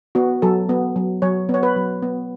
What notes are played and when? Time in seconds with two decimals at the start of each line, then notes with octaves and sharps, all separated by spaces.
0.15 B3 F#4
0.42 F#3 A4
0.69 B3
0.96 F#3
1.22 F#3 C#5
1.49 B3
1.54 C#5
1.63 B4
1.76 F#3
2.02 B3